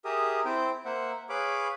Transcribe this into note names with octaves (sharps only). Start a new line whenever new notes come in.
G4 G#4 A#4 E5 D#6
C4 E4 C5 G5
A#3 C5 E5 F#5
G#4 B4 C#5 F5 B5 D6